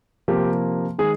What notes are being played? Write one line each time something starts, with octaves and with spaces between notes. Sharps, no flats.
C3 F3 A#3 G4
D#3 G#3 G#4